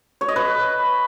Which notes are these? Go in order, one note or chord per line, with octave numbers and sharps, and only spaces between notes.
C#5
D#5
B4